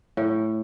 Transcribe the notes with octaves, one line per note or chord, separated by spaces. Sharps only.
A2